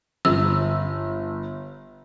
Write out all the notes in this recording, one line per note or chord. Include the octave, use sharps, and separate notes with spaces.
G1 E6